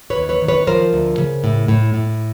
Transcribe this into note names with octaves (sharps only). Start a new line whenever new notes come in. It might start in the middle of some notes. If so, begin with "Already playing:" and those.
B4 C#5
D#2
B4 C#5
D#3
B4 C#5
F3 A#4 C5
D2
C#3
A2
A2
A2